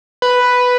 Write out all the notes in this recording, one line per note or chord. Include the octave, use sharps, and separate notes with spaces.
B4